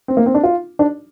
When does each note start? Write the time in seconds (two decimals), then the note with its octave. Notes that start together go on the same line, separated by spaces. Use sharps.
0.08 C4
0.17 A#3
0.26 C4
0.34 D4
0.43 F4
0.79 D4